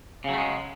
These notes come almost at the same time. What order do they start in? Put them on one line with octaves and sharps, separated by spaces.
C#3 F#3 A3 G#3